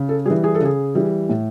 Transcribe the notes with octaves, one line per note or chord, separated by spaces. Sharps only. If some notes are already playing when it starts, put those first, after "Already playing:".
Already playing: C#3
A4
E3 G3 G#4
G#4
A4
C#3 G#4
E3 G3
A2